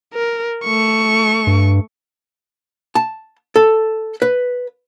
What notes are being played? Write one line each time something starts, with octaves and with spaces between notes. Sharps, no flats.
A#4
A3 C#6
G2
A5
A4
B4